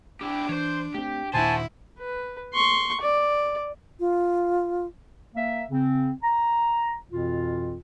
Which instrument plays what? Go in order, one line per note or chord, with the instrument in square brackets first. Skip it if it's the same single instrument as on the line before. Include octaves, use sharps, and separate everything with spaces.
[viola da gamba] D4 [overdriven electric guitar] E4 G4
[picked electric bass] E3 [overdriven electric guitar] C5 C#5
[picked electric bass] A3 C4 [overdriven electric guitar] G4
[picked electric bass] D#1 A#2 D#3 [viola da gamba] E4 [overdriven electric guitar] F#4 C5 [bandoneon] G#5 A5
[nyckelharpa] B4
C6 C#6
D5
[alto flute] F4
[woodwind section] A#3 E5
C#3 C4
A#5
F2 B2 E3 F4